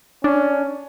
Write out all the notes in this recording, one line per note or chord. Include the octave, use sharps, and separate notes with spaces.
C#4 D4